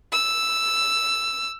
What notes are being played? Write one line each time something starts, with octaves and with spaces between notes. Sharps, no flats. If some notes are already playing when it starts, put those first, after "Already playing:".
E6